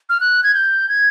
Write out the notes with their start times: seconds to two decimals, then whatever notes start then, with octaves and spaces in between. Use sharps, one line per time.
0.09 F6
0.20 F#6
0.43 G#6
0.54 G6
0.89 G#6